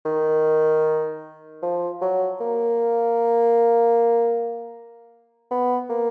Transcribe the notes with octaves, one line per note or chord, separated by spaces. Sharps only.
D#3
F3
F#3
A#3
B3
A#3